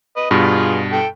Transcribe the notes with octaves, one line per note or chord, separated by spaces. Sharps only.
B4 D#5
G2 B2 F4 G#4
A4 G5